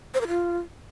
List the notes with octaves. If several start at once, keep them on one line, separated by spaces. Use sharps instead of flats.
C5
A#4
F4